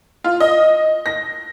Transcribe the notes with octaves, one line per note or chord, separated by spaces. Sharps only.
F4
D#5
A#6